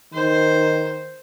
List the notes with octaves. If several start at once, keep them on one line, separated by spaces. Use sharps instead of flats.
D#3 C5